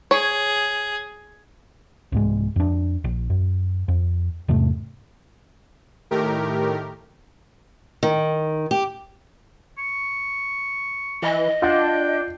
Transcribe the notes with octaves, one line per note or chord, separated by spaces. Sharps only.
G#4 C#5
C2 G#2 G#3
F2 D4
A#1
F#2
F2
E2 G#2 C3 A3
A2 D#3 A3 G4 A#4
D#3
G4
C#6
E3 D#5
D4 F4 F#5 G5